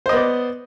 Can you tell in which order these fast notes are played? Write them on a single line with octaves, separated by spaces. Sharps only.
C5 D#5 B3 D5